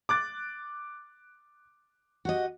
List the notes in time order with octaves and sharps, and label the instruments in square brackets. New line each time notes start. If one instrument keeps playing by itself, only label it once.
[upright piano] D6 F#6 A6
[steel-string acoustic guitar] F#4 G4 D#5